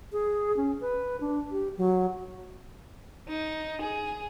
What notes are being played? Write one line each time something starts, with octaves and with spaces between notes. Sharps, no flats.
G#4
C#4
B4
D4
G4
F#3
D#4
G#4